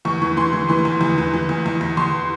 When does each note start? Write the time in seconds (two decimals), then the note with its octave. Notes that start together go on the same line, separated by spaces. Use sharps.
0.05 E2 C#6
0.22 E3
0.37 E3 C6
0.53 E3
0.69 E3 C6
0.85 E2
1.01 E2
1.18 E3
1.34 E3
1.49 E2
1.66 E2
1.81 E2
1.97 E2 C6